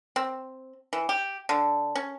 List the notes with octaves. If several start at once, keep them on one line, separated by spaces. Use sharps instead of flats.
C4
E3
G4
D3
C#4